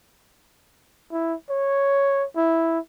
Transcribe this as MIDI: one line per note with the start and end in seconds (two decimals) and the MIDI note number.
1.12 1.35 64
1.50 2.25 73
2.36 2.79 64